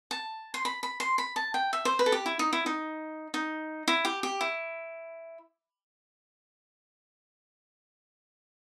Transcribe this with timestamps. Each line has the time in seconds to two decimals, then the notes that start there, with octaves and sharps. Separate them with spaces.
0.11 A5
0.54 C6
0.65 B5
0.83 B5
1.00 C6
1.18 B5
1.36 A5
1.54 G5
1.73 E5
1.85 C5
1.99 B4
2.06 A4
2.12 G4
2.26 E4
2.39 D#4
2.53 E4
2.66 D#4
3.34 D#4
3.88 E4
4.05 G4
4.23 G4
4.41 E4